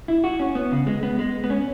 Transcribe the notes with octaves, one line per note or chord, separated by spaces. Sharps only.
E4
F#4
C#4
B3
C#3
G#3
B3
G#3
B3
C#4